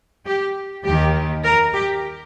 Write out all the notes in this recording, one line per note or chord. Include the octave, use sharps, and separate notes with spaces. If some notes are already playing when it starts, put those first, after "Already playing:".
G4
D#2 D#3 G4
A#4
G4